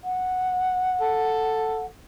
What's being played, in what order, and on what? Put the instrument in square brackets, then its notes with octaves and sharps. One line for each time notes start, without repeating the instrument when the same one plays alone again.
[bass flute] F#5
[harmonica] A4